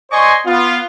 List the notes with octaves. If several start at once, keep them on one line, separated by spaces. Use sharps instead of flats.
C5 D5 D#5 G#5 C6 C#6
B3 F4